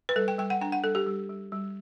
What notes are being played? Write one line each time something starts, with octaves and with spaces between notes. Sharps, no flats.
B4
G3 A4
G5
G3 G5
F#5
D4 G5
F#5
G3 A4
G4
G3
G3
G3